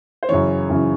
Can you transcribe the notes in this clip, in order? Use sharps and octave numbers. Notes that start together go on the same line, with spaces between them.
C5
F#2 C#3 E3 C#5
F#2 C#3 E3